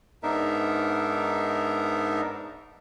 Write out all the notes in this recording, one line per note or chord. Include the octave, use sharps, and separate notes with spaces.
G#2 B3 D4 D#4 A#4 E5